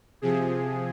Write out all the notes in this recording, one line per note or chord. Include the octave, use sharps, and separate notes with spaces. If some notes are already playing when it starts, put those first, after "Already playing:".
C3 F3 G#4